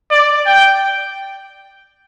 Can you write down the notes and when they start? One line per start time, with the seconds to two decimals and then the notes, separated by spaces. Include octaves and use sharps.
0.11 D5
0.46 G5